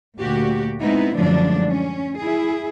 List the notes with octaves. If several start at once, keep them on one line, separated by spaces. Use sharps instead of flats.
D2 A#2 F#4 G4
G#3 B3 C4 D#4 E4
F#2 A2 D3 F3 G#3 D4
C#4
E4 G#4